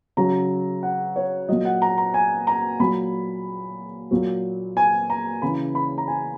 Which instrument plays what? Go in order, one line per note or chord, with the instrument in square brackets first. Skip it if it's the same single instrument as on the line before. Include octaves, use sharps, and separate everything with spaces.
[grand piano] C#3 F#3 A#5
F#5
C#5
A#2 F#3 D#5
F#5
A#5
A#5
G#5
A#5
A#2 F#3 B5
A#2 F#3
G#5
A#5
C#3 E3 B5
B5
A#5
G#5